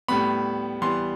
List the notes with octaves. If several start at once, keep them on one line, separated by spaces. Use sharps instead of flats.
A2 G3 B3 B5
E3 G3 B3 C6